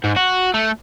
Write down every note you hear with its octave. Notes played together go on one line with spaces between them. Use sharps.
G#2
F#4
A3